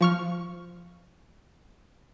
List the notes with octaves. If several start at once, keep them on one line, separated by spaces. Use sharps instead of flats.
F3 C#6 F6